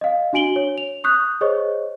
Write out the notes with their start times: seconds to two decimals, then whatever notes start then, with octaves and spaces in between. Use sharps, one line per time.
0.01 D#5 F5
0.33 D4 F#4 G#5 D7 F#7 G7
0.56 C#5
0.78 F7
1.04 C#6 D#6 F#6 G6
1.41 G#4 C5 C#5 D#5 C#6